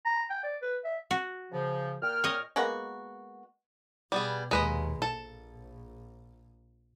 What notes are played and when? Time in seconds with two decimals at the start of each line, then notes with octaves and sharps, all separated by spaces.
0.06 A#5
0.30 G5
0.43 D5
0.62 B4
0.84 E5
1.11 F#4
1.52 C#3 F3
2.02 A#2 G5 F6
2.24 C#5 D#5
2.56 G#3 A#3 B3 F#4
4.12 B2 G3 B3 G#4
4.51 D#2 A#2 G#3 B4 D#5
5.02 A#1 A4